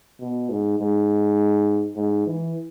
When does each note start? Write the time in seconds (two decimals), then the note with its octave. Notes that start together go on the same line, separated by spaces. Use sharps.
0.20 B2
0.49 G#2
0.78 G#2
1.96 G#2
2.26 E3